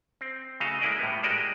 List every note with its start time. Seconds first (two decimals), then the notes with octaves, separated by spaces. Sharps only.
0.21 C4
0.60 C#3 A3 F#4 D#5 F5
0.81 G#3 A#3 E4 D5 D#5
0.99 A2 G3 B3
1.23 G#3 A#3 F#4 G4 D5 D#5